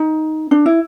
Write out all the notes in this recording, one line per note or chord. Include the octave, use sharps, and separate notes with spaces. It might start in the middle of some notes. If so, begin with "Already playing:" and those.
Already playing: D#4
D4
E4